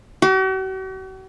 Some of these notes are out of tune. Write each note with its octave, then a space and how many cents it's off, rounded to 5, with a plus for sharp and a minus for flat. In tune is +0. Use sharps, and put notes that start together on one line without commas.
F#4 +45 D6 +0